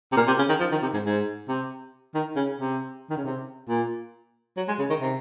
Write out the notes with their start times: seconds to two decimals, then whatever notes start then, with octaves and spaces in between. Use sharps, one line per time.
0.12 C3
0.16 A#2
0.27 C3
0.38 C#3
0.49 D#3
0.60 F3
0.72 D#3
0.82 C3
0.94 G#2
1.05 G#2
1.48 C3
2.15 D#3
2.36 C#3
2.59 C3
3.10 D#3
3.17 C#3
3.24 C3
3.69 A#2
4.57 F#3
4.68 G#3
4.79 C#3
4.90 D#3
5.01 C3